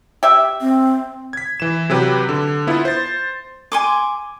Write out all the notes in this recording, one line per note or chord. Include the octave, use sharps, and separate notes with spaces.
G4 E5
C4
G#6 B6
E3 E7
C3 F#3 G4 B4
D3
B3 E4 F4
C5 A6
G#5 C6 D6